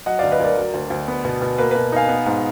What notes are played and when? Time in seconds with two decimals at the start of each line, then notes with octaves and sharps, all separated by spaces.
0.06 F#3 D#5 F#5
0.19 D2 D5 F5
0.32 B4 D#5
0.40 D2 A#4 D5
0.57 F#3
0.74 D2
0.90 D2
1.08 B3
1.25 B2
1.42 B2
1.58 A#3 B4
1.71 B2 B4
1.92 D#4 F5 G#5
2.09 B3
2.26 G#2